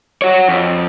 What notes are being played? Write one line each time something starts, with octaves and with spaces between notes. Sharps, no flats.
F#4 C#5
F2